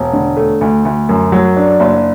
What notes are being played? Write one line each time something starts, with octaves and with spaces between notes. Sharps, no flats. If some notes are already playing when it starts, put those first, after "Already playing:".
Already playing: E1
D3
A3
D2
D2
F#2
F#3
D4
F#1